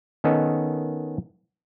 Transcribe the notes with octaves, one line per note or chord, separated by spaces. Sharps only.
D#3 B3 C#4 A4 D#5